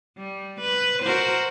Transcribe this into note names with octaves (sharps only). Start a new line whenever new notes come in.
G3
B4
F#4 A#4 C5